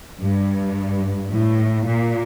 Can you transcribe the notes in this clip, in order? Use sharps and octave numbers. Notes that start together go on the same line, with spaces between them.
G2
A2
A#2